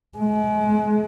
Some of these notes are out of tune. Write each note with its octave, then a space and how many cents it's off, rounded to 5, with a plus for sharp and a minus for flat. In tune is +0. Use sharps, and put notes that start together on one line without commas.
G#3 +35